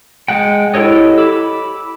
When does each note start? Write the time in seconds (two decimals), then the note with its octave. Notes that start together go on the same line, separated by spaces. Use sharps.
0.28 G#3 F#5 G5
0.74 E4 G4 A4 C#5 D#5
1.18 B5 D6 E6